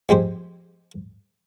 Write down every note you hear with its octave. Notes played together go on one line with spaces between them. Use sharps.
F2 G#3 G4 C5